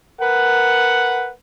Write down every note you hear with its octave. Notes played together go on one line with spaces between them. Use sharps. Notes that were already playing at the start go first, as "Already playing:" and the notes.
A#4 B4 F#5